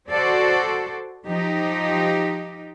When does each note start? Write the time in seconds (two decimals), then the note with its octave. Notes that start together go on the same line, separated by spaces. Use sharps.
0.11 F#4 A4 C5 D5
1.27 F3 D#4 G4